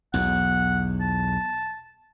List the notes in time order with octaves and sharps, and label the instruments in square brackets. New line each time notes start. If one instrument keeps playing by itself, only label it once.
[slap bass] B1 E2 [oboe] F#5
[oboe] A5